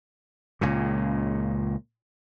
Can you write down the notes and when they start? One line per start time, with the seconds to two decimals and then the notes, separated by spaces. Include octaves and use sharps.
0.61 C#2 A#2 C#3